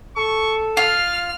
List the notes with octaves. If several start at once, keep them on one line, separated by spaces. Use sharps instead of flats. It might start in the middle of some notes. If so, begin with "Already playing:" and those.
A4 C#6
F4 F5 F6